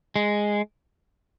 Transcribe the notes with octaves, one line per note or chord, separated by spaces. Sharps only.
G#3